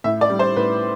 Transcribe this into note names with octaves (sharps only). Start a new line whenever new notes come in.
A2 E5
D5
G3
C5
A2 B4